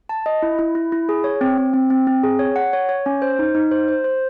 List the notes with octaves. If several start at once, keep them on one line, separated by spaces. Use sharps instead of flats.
A5
D#5
E4
E4
E4
E4
G#4
C#5
C4
C4
C4
C4
C4
G#4
C#5
F#5
C#5
C#5
C#4
C5
D#4
D#4
C5
C5
C5